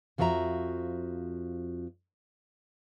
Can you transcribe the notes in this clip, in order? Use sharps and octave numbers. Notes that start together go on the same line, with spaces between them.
F2 F3 F#4 A4 E5 A#5